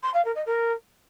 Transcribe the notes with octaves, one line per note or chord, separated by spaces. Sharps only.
C6
F5
A#4
D#5
A#4